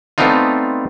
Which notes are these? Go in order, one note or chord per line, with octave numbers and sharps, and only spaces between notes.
A3 B3 C4 D4 D#4 F4